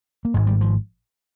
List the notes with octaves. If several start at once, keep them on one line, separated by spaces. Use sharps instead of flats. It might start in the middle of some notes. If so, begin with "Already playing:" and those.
A#3
G#1 G#2 G#3
G3
F3